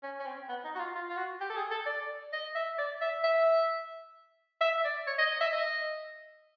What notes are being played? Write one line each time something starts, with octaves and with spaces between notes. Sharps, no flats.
C#4
C#4
C4
B3
D#4
F#4
F4
F4
F4
F#4
G4
A4
G#4
A4
D5
D#5
E5
D5
E5
E5
E5
D5
C#5
D#5
D#5
E5
D#5